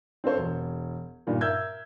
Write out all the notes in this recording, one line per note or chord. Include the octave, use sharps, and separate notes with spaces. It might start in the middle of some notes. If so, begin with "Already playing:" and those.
C4 D4 A4 C5 C#5
E1
G2 A#2 D#3
A#4 E5 E6 G6 G#6